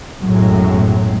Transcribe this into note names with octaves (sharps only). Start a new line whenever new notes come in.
B1 F#2 A2 F#3 G#3